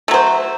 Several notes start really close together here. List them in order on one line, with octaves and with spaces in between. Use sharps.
A3 F#3 C5